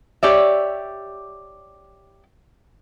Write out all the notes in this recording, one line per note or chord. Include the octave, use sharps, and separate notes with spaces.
G4 C#5 D5 E5